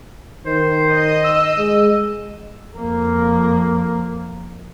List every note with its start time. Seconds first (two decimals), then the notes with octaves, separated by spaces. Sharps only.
0.46 D#3 C5
0.93 D#5
1.24 E6
1.58 G#3
2.77 F2 A#3